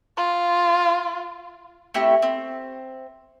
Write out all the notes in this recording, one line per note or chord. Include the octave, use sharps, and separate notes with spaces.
F4
A3 C4 E4 G4
C4